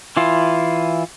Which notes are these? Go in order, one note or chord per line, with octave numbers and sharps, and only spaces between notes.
E3 E4 F4